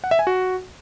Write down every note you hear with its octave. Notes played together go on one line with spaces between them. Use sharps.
F#5
E5
G#5
F#4